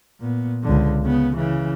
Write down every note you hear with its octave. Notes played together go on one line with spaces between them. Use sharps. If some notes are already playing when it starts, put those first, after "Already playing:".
A#2 B3
C#2 D3
C#3 B3
C#3 E3